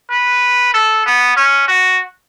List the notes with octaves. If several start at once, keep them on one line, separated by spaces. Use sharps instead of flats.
B4
A4
B3
C#4
F#4